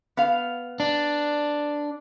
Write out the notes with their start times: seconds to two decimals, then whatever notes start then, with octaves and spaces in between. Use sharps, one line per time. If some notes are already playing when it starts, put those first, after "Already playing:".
0.17 B3 F5
0.80 D4